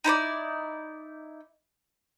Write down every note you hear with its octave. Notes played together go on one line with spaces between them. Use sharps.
D#4 E4 C5 D5